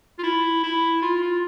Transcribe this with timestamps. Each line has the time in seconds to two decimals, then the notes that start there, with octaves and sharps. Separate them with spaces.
0.18 F4
0.23 E4
0.63 E4
1.02 F4
1.22 F4